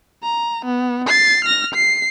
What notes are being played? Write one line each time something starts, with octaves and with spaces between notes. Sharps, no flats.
A#5
B3
A6 C7
F6 A#6
C7